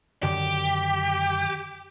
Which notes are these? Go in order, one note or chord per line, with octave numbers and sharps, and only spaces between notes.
F#2 D3 D#3 G4